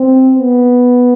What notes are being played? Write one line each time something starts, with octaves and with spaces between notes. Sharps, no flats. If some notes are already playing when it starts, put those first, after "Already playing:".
Already playing: C4
B3